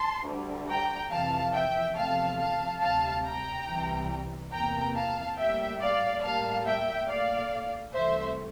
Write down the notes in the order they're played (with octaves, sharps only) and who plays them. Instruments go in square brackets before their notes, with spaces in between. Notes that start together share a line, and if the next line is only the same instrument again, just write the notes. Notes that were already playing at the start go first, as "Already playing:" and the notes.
Already playing: [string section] A5 C6
D2 D3 G3
G5 A#5
F2 C3 E3 F5 A5
E5 G5
E2 C3 F3 A3 F5 A5
F5 A5
D2 C3 G3 F5 A5
G5 A#5
C2 C3 E3 G3
E2 C3 E3 A#3 G5 A#5
F5 A5
A2 G3 A#3 E5 G5
D5 F5
A2 G3 A#3 F5 A5
E5 G5
A#2 A3 D5 F5
C2 C3 E3 A3 C5 E5